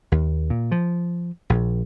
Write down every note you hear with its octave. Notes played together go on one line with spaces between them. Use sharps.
D#2
A#2
F3
A#1